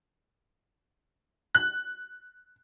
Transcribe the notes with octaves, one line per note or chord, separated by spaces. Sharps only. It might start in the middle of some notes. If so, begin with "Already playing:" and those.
F#6